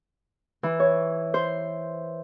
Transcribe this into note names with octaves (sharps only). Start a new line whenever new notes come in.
E3
C#5
C5